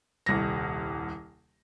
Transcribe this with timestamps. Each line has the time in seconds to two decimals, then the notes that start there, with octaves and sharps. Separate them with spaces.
0.26 D#1 C2 A#6